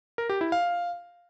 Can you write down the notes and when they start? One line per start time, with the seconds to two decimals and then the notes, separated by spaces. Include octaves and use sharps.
0.18 A#4
0.29 G4
0.41 E4
0.52 F5